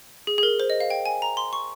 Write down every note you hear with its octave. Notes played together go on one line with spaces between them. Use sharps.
G#4
G#4
A#4
C5
D#5
F5
G5
G#5
A#5
C6
C#6